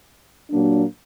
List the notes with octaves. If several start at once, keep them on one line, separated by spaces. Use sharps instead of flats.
A#2 F#3 A#3 D4